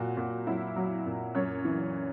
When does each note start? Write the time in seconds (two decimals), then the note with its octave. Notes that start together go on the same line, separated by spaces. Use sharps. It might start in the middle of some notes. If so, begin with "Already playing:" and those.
Already playing: A#2 F#3 F#4
0.17 A#2
0.47 F#3 E4
0.76 F#3
1.06 A#2
1.35 F#2 C#5
1.65 E3